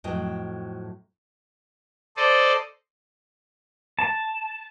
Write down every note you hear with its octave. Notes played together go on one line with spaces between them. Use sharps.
F2 A2 F#3 D#5 G5
A4 C5 D5 D#5
A5